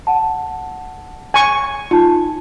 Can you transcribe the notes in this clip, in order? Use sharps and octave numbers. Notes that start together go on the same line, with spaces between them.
F#5 A5
G#5 C#6
D#4 F4 A5